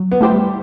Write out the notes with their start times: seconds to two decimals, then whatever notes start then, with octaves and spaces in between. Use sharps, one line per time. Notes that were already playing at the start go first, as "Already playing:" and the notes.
Already playing: F#3
0.12 B3
0.21 A3 E4 G4 C5
0.30 G3